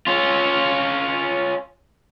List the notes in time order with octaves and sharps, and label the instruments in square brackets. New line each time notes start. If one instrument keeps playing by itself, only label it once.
[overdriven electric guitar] C#4 F4